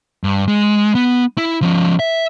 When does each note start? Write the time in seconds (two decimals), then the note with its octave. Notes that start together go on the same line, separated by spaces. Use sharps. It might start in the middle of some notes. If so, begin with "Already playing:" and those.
0.24 G2
0.48 G#3
0.95 B3
1.38 E4
1.62 F3 C#4
1.99 E5